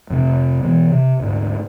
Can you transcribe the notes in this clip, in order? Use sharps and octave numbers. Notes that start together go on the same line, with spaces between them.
F2 C3 F3
B2 E3 B3
C3
D2 G#2